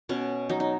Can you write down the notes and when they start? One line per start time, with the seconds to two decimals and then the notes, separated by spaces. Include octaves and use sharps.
0.09 B2 C#4
0.49 F#3 D#4
0.60 D#4